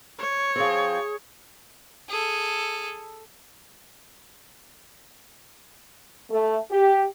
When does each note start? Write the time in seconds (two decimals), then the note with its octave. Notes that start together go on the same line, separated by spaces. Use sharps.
0.19 C#5
0.56 F3 C4 G#4
2.09 G#4 A4
6.31 A3
6.71 G4